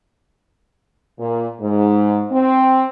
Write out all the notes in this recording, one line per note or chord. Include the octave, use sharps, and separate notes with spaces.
A#2
G#2
C4